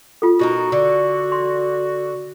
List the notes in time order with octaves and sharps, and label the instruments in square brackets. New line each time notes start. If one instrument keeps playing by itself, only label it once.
[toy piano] F4 A4
[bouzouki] B2 D#4 A#4 [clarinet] F#4
[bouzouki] D3
[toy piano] C6